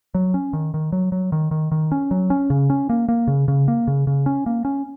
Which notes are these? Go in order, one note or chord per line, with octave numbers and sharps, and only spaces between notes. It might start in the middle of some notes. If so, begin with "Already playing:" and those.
F#3
C#4
D#3
D#3
F#3
F#3
D#3
D#3
D#3
C#4
F#3
C#4
C#3
C#4
A#3
A#3
C#3
C#3
A#3
C#3
C#3
C#4
A#3
C#4